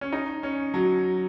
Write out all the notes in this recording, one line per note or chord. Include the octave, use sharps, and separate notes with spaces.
C#4
D#4
C#4
F#3